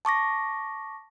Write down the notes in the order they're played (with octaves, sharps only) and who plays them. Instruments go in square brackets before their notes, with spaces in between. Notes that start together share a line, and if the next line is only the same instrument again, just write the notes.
[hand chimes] A5 C#6 D6 A#6